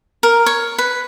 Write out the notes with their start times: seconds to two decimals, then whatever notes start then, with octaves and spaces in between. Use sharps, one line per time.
0.23 A#4
0.46 C#5
0.78 B4